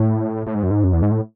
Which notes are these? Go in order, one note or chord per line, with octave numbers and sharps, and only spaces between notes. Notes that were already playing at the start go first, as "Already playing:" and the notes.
Already playing: A2
A2
G#2
F#2
G#2
F#2
E2
G#2
A2